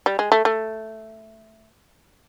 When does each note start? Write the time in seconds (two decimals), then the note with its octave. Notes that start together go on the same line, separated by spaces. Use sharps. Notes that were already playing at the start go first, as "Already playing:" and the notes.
0.06 G3
0.19 G#3
0.32 A3
0.45 A3